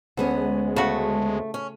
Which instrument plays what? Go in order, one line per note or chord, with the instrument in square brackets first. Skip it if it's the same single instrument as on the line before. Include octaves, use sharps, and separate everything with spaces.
[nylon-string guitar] D2 B3 C#4 [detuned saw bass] G#3
[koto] C#3 F#4 [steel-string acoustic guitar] A3
[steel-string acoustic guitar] C#4